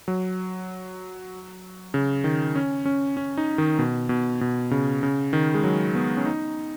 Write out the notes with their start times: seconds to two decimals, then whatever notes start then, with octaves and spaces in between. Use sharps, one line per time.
0.08 F#3
1.94 C#3
2.24 D#3
2.55 C#4
2.85 C#4
3.17 C#4
3.37 D#4
3.58 D#3
3.79 B2
4.09 B2
4.41 B2
4.71 C#3
5.03 C#3
5.33 D#3
5.54 G#3
5.64 F#3
5.95 B3
6.17 C#4
6.25 D#4